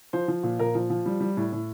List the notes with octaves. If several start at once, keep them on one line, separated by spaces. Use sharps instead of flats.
F3 C5
F3
A#2
A#2 A#4
F3
F3
G3
G3
A2
A2